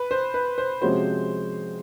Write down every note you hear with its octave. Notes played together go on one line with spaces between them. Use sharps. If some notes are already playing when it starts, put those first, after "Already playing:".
Already playing: B4
C5
B4
C5
C3 F3 G#3 C#4 F#4 C5